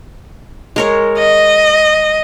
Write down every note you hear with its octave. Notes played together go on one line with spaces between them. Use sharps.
G#3 A#4 C#5
D#5